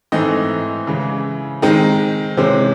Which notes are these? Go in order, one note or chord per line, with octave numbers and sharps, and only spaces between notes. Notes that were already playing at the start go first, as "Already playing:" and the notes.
G#2 E3 A3 C4 D#5
C#3 E3 G#3
D#3 G#3 C4 D#4
C3 E3 G#3 C#4 C5